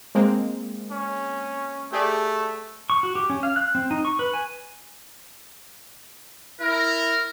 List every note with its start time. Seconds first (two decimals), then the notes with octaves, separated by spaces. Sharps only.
0.15 G#3 A#3 C4
0.91 C#4
1.93 A3 G4 G#4 D5
2.90 C#6
3.03 F#4
3.15 G4
3.30 C#4
3.43 F5
3.56 F#6
3.75 C4
3.91 D#4
4.05 C#6
4.19 B4
4.34 G#5
6.60 E4 A#4